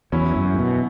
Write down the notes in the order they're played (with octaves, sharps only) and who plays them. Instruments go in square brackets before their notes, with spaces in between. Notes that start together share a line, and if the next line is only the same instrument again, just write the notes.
[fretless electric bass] E2 [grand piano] F#3 C#4 E4
[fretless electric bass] F#2
G#2
B2